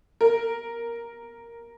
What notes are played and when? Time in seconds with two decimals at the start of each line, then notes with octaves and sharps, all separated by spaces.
0.21 A#4